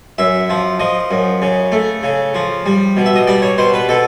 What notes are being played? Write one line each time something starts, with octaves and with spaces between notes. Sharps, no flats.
F#2 E5
F3
F3 D#5
F#2
C#3
A3
C#3
F3
G3
B2
E5
D#5
G3 D5
C#5
B2 C5
B4
B2 A4